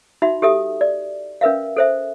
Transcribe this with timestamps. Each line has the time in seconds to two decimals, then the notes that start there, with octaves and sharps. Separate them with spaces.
0.22 D#4 F#4 E5 B5
0.42 G4 A4 E5 D#6
0.81 D5
1.41 C#4 A#4 B4 E5 F5
1.77 A4 C5 E5